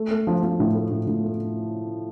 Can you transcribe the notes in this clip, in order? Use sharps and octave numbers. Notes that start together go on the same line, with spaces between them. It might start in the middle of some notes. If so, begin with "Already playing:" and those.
Already playing: A3
A3
F3
F3
A2
A3
A2
A2
A3